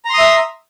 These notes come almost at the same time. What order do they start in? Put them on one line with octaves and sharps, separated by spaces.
A#5 C6 D#6 E5